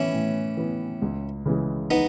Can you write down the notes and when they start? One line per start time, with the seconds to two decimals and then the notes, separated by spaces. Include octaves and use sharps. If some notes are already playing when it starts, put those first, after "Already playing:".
Already playing: A2 E3 B3 C#4 E4
0.13 A2
0.57 E3 B3
1.02 C#2
1.46 C#3 E3 G#3
1.91 B3 D#4